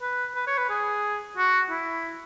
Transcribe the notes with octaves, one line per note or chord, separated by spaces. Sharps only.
B4
B4
C#5
B4
G#4
F#4
E4